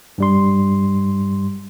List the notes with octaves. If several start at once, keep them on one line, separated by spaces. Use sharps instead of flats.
G2 G3 C6